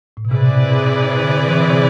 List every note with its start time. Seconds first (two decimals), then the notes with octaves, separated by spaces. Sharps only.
0.17 A2
0.25 B2
0.31 C3 C4 E4 G#4 B4 D5
1.19 D3
1.48 E3
1.71 C3